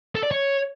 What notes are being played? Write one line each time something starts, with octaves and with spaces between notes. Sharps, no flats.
A4
D5
C#5